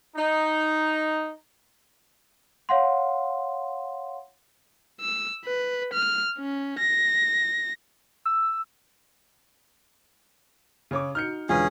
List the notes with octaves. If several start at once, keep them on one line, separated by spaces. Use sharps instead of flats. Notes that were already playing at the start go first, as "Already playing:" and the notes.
D#4
C#5 F5 F#5 C6
E6
B4
F6
C#4
A#6
E6
C#3 C#5 D6
D#4 F#4 F6 G6 C#7
E1 D3 C#4 F4 G#4 B4